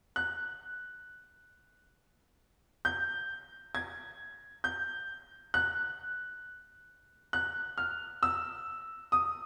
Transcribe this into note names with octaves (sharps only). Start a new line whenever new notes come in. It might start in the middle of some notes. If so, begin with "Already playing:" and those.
F#6
G6
G#6
G6
F#6
F#6
F6
E6
D#6